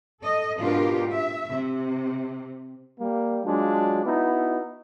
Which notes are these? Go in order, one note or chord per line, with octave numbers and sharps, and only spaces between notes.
A4 D#5
G#2 B2 D4 F4 G4 A#4
E5
C3
G3 A#3
F#3 G#3 D4 F4
B3 D#4 E4 F#4